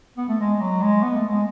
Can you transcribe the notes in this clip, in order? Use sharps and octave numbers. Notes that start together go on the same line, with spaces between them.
B3
A3
G#3
F#3
G#3
B3
A3
G#3